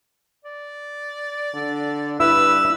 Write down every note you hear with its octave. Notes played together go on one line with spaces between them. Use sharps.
D5
D3
G2 E4 B4 E6